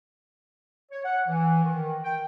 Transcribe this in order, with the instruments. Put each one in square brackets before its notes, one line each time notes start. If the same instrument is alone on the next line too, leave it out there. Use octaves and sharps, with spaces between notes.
[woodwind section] C#5
F#5
E3
D#3
G5